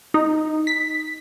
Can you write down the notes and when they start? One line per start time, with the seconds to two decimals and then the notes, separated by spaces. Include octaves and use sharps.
0.14 D#4
0.67 B6